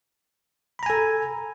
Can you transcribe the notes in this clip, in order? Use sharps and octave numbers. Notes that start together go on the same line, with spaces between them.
A4 G#5 A#5 B5